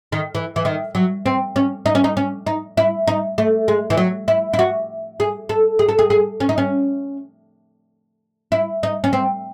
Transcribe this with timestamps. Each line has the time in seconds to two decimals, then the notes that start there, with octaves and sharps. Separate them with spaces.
0.12 D#3
0.35 E3
0.56 E3
0.65 D#3
0.95 F#3
1.26 C4
1.56 C#4
1.86 D#4
1.95 C#4
2.04 D#4
2.17 C#4
2.47 D#4
2.77 E4
3.08 D#4
3.38 A3
3.68 G#3
3.90 E3
3.97 F#3
4.28 E4
4.53 E4
4.59 F#4
5.20 G#4
5.49 A4
5.79 G#4
5.89 A4
5.99 G#4
6.10 G#4
6.40 C#4
6.49 D#4
6.58 C#4
8.52 E4
8.83 D#4
9.04 C#4
9.13 C4